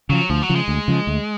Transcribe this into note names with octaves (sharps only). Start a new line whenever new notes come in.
C#3 F3 F#3
D2 F3
F#3
C#3 F3
G#3
D2
C#3 F3
D2